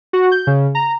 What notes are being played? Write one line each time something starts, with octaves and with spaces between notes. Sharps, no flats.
F#4
G6
C#3
A#5